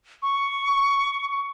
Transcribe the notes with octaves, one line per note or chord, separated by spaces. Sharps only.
C#6